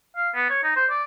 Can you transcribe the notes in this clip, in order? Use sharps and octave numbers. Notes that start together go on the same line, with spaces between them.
F5
B3
C#5
D#4
C5
D5